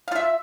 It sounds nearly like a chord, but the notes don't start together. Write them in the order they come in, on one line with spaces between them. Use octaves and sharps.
F5 F4 E5